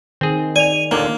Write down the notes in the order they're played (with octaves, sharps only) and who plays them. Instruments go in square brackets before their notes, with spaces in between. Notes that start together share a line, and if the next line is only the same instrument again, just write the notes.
[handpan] D#3 [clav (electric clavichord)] C4 G#4
[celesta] D5 F7 [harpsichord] G#5
[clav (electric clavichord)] D#2 A#2 D3 [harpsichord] A#3